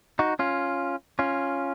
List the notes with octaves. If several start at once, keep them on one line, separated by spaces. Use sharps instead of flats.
D#4 F#4
C#4 F4
C#4 F4